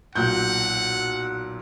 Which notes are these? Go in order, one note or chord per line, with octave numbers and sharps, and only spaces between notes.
B1 A#2 F#5 G6